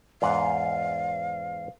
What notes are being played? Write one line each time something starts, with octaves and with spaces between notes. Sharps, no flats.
E2 G#2 F5 F#5